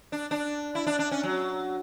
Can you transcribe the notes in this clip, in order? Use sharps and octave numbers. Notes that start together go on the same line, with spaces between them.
D4
D4
E4
D4
D4
C#4
F#3